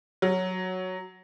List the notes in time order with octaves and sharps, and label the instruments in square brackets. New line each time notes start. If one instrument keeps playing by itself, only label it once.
[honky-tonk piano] F#3